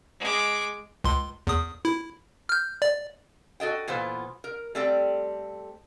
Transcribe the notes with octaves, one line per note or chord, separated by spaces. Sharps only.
G#3 D6
C#2 C6
E2 D#6
E4
F6 G6
D5
F#4 A4 D#5 G5
A#2 E3 B3 F4 C5
A#4
G3 A3 C4 A4 D5 G5